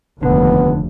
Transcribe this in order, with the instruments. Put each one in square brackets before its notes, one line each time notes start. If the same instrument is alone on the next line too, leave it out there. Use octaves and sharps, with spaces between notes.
[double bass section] F1 D#2 [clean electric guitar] D3 [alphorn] B3